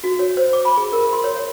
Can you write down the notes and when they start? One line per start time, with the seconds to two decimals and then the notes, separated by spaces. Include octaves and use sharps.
0.04 F#4
0.19 C#5
0.37 C5
0.53 D6
0.65 B5
0.77 G#4
0.93 A#4
1.13 C6
1.24 C#5
1.37 C#5